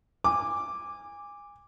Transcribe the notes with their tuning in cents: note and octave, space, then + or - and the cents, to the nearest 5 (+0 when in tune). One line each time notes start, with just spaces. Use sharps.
G#5 -25 D6 +0